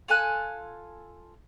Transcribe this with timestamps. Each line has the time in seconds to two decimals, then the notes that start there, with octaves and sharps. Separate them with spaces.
0.08 F4 A4 G#5 F#6